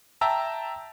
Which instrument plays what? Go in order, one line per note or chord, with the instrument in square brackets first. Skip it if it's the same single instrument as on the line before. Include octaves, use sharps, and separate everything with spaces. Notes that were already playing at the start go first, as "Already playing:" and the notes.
[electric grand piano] E5 G5 A5 A#5 E6